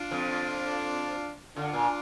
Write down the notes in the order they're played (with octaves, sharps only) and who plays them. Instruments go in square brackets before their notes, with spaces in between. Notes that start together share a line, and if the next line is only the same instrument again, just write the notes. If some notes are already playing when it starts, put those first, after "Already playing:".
Already playing: [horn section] D4 F4
[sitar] F2 F3
[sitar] D3 [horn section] D4 F4
[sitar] A#2